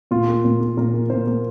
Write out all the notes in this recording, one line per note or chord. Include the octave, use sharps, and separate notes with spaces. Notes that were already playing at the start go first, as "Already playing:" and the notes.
A#2 F4
A#3
A#2
A#3
A#2 A#4
A#3
A#2 C5
A#3 A#4